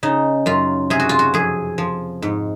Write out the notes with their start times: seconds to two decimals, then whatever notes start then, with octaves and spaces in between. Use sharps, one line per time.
0.03 C#3 D#4
0.46 F#2 F4
0.90 C3 G#4
1.00 F#4
1.09 F4
1.19 F#4
1.34 F2 G#4
1.78 F3
2.22 G#2